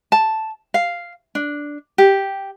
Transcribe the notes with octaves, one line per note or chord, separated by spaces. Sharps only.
A5
F5
D4
G4